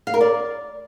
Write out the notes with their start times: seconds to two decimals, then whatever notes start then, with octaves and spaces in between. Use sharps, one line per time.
0.07 F5
0.14 A#4
0.21 D5